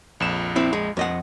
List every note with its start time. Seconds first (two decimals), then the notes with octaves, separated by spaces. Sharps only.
0.20 A#1 F2 E7
0.56 C4 E4
0.73 G#3
0.97 F2 D#5 F#5